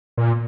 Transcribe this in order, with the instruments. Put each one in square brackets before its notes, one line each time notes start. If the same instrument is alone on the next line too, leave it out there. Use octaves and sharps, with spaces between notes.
[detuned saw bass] A#2